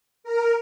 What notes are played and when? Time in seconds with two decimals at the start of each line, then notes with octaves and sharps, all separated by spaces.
0.24 A#4